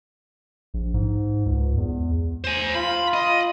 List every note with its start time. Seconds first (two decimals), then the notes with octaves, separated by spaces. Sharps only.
0.74 A#1
0.94 G#2
1.46 C#2
1.77 E2
2.44 C5 G#5
2.75 F4 B5
3.14 D#5